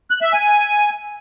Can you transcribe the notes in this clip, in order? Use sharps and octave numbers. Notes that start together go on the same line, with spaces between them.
F#6
E5
G#5